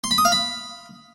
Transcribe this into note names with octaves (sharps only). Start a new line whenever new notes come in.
C6
B5
D#6
F5
B5